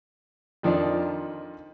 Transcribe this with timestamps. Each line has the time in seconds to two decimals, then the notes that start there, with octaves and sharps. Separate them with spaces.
0.63 F2 D#3 F3 D4 D#4